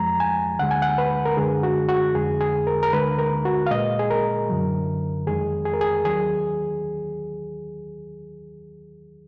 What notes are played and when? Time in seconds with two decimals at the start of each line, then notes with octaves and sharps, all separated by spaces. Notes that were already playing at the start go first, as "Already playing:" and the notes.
Already playing: F2 F3 G#3 A#5
0.20 G#5
0.59 D2 D3 G#3 F#5
0.71 G#5
0.82 F#5
0.98 B4
1.25 A#4
1.37 F#2 D3 G#3 G#4
1.63 F#4
1.89 F#4
2.15 F2 D3 G#3 G#4
2.41 G#4
2.67 A#4
2.83 A#4
2.93 D2 D3 G#3 B4
3.18 A#4
3.45 F#4
3.67 F5
3.71 A#2 G#3 D#5
3.99 G#4
4.10 A#4
4.49 F#2 D3 F#3
5.27 F2 D#3 G#3 G#4
5.65 G#4
5.73 A#4
5.81 G#4
6.05 D#2 D#3 F#3 G#4